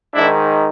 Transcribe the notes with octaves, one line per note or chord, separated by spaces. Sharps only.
G#2 D#3 D4 E4